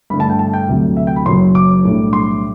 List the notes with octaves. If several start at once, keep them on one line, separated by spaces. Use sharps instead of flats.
G2 D3 A3 B5
A5
G5
A5
G5
D2 C3 F#3
E5
G5
B5
F#1 F#2 F#3 C6
D6
B1 A2 G3 D4
C6